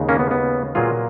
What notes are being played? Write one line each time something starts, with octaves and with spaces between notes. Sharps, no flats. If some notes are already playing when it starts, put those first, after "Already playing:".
Already playing: D#2 C#3 G#3
A#3 C#4
B3
B3
A#2 F#3 A#3 F4 G#4